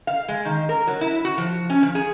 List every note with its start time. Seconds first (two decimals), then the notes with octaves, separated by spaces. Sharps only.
0.07 F5
0.28 G#3
0.45 D#3
0.69 A#4
0.87 F#3
1.01 E4
1.25 F#4
1.38 F3
1.70 C#4
1.83 F3
1.95 G#4